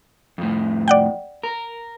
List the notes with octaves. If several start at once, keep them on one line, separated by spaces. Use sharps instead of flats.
F2 A2
D5 F#5 G5
A#4